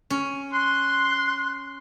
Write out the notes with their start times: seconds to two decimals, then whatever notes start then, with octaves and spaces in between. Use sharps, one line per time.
0.10 C#4
0.53 C6 F#6